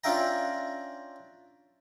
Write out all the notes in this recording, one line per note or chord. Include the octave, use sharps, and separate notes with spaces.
C#4 D4 F4 E5 G5 A#5